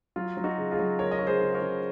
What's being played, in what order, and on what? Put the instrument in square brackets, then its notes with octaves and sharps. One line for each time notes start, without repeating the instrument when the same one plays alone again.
[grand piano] F#3 F4
F#3
D#4 F#4
C#3
F4 G#4
F#3
C#3 A#4 C#5
D#5
C#3 C#5
G#4 C5
C#3
A#4 C#5
C#3